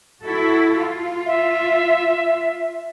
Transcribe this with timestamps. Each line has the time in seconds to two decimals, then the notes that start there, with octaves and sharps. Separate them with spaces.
0.24 E4 F#4 A4
0.77 F4
1.26 E5